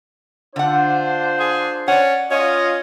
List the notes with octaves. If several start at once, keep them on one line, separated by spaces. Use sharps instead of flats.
D3 D4 F4 C5 F#5
G#4
C#4 D5 F#5
C#4 F4 D#5